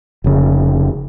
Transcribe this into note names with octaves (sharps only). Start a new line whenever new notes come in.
F1 C#3